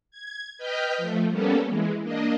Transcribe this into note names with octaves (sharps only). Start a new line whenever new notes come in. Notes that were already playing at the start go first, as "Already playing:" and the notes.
G#6
B4 D#5 G5 B5 F6 G6
F3 A3
G3 A#3 B3 C#4 A4
E3 G#3
A#3 D4 D#5